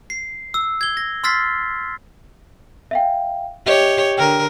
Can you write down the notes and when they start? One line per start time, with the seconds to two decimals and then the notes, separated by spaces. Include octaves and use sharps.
0.10 C7
0.54 E6
0.81 G#6 G7
0.97 A#6
1.24 C6 E6 F6 A6 B6 C7
2.91 E5 F5 G5
3.66 G4 C#5 D#5 E5
4.18 D3 A#4 G5